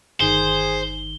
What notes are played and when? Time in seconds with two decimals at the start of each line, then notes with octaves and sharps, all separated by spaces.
0.20 G1 D#3 G#4 C5 G7